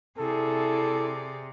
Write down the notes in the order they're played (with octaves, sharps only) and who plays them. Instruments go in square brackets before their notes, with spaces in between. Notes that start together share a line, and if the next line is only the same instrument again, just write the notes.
[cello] C3 [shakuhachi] E4 [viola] G#4 D5 [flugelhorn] A4